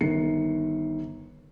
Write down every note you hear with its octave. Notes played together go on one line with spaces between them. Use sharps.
G1 D#3 C7 C#7